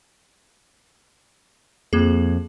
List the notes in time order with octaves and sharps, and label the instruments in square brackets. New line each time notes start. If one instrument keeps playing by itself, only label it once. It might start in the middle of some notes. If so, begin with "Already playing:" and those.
[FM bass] F2 [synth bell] A#3 G#4